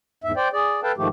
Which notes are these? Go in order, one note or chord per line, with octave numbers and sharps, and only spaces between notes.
E2 G#2 E5
C5 D5 G5
G#4 D5
A4 B4 F5 G5 A5
G#2 D#3 F3 A3 G4